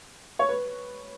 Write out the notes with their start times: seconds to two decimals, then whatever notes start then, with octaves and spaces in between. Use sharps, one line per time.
0.39 C#5
0.48 B4